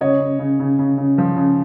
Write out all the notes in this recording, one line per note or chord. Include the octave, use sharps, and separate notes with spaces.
C#3 C#5 D#5
C#3
C#3
C#3
C#3
C#3
F3
C#3